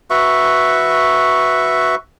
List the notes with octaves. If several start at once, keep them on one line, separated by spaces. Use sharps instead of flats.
F#4 B4 E5 C#6